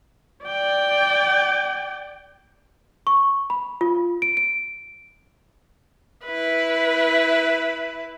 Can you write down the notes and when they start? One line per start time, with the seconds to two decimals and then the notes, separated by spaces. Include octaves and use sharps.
0.44 D5 G5
3.07 C#6
3.50 B5
3.81 F4
4.22 D7
4.37 D7
6.25 E4 B4